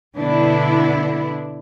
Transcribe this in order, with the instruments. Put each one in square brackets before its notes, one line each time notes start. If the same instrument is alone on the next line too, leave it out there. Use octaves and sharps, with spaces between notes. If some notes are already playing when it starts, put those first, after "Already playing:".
[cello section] B2 D3 B3 D4 E4